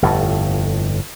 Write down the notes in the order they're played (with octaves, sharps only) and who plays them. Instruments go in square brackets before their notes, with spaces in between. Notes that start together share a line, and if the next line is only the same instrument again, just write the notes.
[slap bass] G1 F2 A2